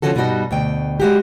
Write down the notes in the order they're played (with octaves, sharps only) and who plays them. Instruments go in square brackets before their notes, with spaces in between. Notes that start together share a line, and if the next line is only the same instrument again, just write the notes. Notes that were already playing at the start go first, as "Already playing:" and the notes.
[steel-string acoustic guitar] D3 F3 A3 C#4 F#4 A4
G2 B2 G3 D#4 F#4 D#5
D2 B2 G5
G#3 F#4 G4